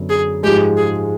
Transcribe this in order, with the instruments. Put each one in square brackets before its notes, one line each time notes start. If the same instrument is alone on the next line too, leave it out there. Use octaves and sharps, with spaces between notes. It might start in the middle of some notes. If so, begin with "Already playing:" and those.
Already playing: [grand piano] F#2 D3 F#3 B3
[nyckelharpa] G#4
[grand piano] G#2 F3 G#3 [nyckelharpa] G4
[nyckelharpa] G#4